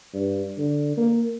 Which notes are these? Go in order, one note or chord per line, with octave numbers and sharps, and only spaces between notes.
G2
D3
A#3